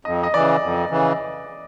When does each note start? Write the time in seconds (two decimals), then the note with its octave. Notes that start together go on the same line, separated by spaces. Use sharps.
0.05 F2 D#5
0.23 D#5
0.34 C#3 E3 D5
0.62 F2
0.90 C#3 E3